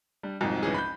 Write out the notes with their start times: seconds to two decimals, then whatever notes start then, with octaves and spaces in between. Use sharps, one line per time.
0.23 G3 D4
0.41 C2 F2 G#2 F#3
0.63 E3 C#4 G#4
0.74 B5 G6